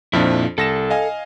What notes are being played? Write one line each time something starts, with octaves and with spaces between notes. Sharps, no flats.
F2 A#2 F3 D4 E4
C2 A4 A#6 E7
D#5 F5 G#5